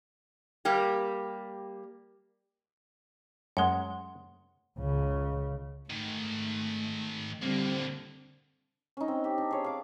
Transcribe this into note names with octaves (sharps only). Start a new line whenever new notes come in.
G3 A#3 G4
F#2 G#3 F#5 C6
C#2 C#3
G#2 D#3 A3
A2 D3 G3 A#3 C4
C#4 D#4
C4
G4
D4
G#4 C#5
F5 D6